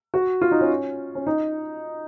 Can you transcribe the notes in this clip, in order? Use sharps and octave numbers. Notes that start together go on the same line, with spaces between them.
F#4
F4
D#4
C#4
C#4
D#4